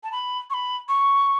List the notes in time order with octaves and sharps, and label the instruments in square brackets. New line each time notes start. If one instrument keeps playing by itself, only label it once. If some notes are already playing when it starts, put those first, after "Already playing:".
[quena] A5
B5
C#6
B5
C#6